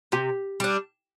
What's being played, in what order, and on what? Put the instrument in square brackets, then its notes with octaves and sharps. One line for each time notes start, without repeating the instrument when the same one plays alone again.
[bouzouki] C3 [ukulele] G4
[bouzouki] G3 D4